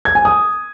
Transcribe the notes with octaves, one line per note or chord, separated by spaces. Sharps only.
G#6
G#5
D#6